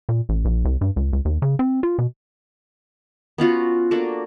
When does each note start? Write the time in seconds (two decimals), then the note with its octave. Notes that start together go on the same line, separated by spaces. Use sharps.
0.09 A#2
0.29 A1
0.45 A#1
0.65 C2
0.81 G2
0.96 C#2
1.13 C#2
1.25 D#2
1.42 C#3
1.59 C4
1.83 F4
1.99 B2
3.38 B3 C#4 F4 F#4
3.91 A#3 D4 F#4 A4